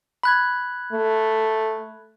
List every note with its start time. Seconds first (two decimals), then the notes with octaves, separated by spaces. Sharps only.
0.23 B5 F#6 G#6
0.92 A3